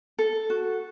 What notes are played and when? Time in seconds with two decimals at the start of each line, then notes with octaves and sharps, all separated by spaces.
0.19 A4
0.50 F#4